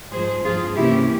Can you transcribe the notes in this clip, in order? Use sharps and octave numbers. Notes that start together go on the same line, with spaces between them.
G#2 F3 G#3 G#4 C5
G2 F3 C4 F4 G#4
C3 E3 A#3 C#4 E4 G4